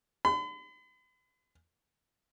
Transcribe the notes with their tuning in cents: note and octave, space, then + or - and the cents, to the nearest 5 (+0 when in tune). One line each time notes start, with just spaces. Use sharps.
B5 +45